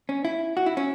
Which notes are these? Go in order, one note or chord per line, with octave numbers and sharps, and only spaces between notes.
C#4
E4
F#4
E4
C#4